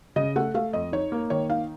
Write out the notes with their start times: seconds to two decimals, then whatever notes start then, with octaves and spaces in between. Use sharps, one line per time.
0.16 C#3 D#5
0.36 A3 F#5
0.54 A3 F5
0.73 F2 D#5
0.92 D#4 C#5
1.12 A#3
1.30 D#3 C#5
1.49 D#4 F5